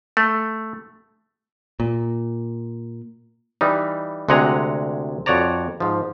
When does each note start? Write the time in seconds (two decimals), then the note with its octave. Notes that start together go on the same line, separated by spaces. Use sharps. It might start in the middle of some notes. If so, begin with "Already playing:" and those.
0.17 A3
1.80 A#2
3.61 E3 G3 D#4
4.29 D2 C3 G#3 F#5 G#5 A#5
5.26 F2 F#4 C#5 D5 A#5
5.80 G#2 F3